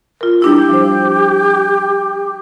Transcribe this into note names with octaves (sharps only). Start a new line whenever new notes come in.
F4 A#4
G3 D4 E4 G4
F3 C5